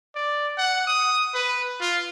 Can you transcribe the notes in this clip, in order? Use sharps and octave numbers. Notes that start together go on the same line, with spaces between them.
D5
F#5
D#6
B4
F4